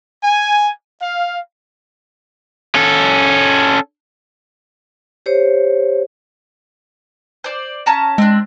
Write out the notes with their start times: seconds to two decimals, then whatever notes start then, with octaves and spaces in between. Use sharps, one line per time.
0.22 G#5
1.00 F5
2.75 C#4 A4
5.26 G4 C5 C#5
7.44 C5 D5
7.86 C#4 A5 A#5
8.18 G#3 C4 D4